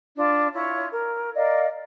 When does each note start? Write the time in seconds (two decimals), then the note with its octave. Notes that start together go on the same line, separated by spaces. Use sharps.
0.17 D4 F4
0.53 E4 F4 C#5
0.91 A#4
1.35 A#4 D5 D#5 F5